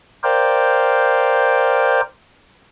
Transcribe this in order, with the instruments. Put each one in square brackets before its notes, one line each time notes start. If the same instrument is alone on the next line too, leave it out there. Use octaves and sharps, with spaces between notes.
[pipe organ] A#4 C5 D5 F5 G5